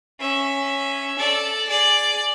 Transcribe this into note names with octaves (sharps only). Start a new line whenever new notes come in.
C#4 E5
A4 D5
G#4 D5